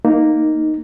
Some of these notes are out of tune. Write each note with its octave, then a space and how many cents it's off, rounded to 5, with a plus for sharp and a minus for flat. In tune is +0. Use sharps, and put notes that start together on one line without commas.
A#3 +0 D#4 +0